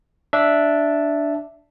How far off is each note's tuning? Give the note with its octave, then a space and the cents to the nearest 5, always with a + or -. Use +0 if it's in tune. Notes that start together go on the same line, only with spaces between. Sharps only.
D4 +0 E5 +0